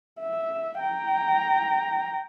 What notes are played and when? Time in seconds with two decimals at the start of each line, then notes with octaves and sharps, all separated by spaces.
0.21 E5
0.81 G5 A#5